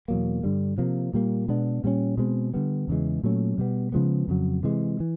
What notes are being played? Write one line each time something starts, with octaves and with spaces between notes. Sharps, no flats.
E2 B2 F#3 A#3
G2 D3 G3
C3 F3 A#3
A#2 G3 A#3
B2 G#3 B3 D4
A#2 G3 A#3 C#4
B2 G#3 C4
D3 G3 B3
E2 C#3 E3 G#3
A#2 F#3 A3 C#4
B2 G3 B3
C#3 F3 G#3 B3
F2 C#3 F#3
C3 E3 G#3
E3